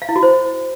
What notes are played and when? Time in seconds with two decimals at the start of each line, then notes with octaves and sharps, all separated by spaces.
0.02 F5
0.09 E4
0.16 F#4
0.23 C5